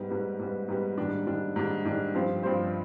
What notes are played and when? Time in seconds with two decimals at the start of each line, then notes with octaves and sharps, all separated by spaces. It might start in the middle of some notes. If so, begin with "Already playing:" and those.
Already playing: G#2 G3 B3
0.10 G#2 G3 B3
0.39 G#2 G3 B3
0.68 G#2 G3 B3
0.98 G#2 D#3 G3 D4
1.27 G#2 D#3 G3 D4
1.56 G#2 D#3 G3 D4
1.85 G#2 D#3 G3 D4
2.15 G2 F3 C4 G4 C5
2.43 G2 F3 C4 G4 C5